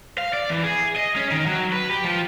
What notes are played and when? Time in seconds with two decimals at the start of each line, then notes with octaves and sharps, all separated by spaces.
0.18 F5
0.33 D5
0.50 E3
0.63 G#4
0.96 D#5
1.16 C#4
1.31 D#3
1.46 F#3
1.72 B4
1.90 G4
2.04 F3